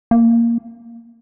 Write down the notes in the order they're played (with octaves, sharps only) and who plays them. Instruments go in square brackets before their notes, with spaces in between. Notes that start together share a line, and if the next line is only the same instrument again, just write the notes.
[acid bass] A#3